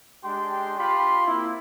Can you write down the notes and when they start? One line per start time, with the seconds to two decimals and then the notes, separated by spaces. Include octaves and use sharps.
0.24 G#3 D4 G4 G5 C6
0.78 F4 G4 B5 C6
1.26 A#3 C4 E4